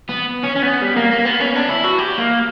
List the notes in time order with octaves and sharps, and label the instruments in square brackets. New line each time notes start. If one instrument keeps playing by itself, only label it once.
[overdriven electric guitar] B3
C#4
C#4
B3
G3
A#3
A#3
B3
C#4
D4
E4
F#4
G4
A#3